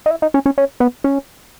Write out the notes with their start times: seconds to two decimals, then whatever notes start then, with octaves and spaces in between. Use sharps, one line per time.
0.06 D#4
0.11 E4
0.22 D#4
0.34 C#4
0.46 C#4
0.58 C#4
0.80 B3
1.04 C#4